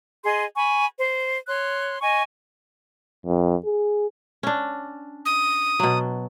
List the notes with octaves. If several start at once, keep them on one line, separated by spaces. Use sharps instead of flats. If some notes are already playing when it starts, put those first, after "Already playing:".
G#4 D#5 C6
G#5 B5 C#6
C5
C#5 C6 F#6
D#5 G#5 C#6
F2
G#4
C#4 D4
D#6
B2 F#3